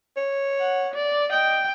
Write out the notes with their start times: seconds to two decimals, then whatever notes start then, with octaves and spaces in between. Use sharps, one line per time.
0.17 C#5
0.60 F#5
0.94 D5
1.32 D#5 G5